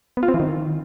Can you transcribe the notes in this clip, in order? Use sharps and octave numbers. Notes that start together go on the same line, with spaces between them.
B3
F4
C4
E3
D#3